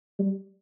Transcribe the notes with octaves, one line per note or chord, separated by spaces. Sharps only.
G3